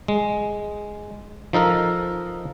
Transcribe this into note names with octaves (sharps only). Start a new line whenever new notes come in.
G#3
F3 D#4 A4 A#4